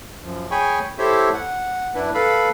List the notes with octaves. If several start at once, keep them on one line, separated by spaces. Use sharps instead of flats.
F#2 F3
G#4 C#5 G5 G#5 B5 C#6
E4 G4 A4 C5 C#5 E5
F#5
F#2 D4 E4 B4
A4 B4 F5 B5